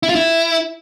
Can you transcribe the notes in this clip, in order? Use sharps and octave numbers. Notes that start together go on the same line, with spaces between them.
E4
F4
E4